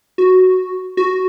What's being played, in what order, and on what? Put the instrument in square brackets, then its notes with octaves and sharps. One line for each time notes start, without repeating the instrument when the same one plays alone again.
[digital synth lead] F#4
F#4